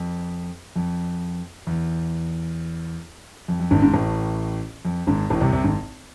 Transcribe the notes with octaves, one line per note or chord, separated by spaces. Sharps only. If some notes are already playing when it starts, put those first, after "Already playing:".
Already playing: F2
F2
E2
F2
F2
G#1 G#2
G#1 G#2
A1 A2
F2
G#1 G#2
A1 A2
C2 C3
C2 C3
G#1 G#2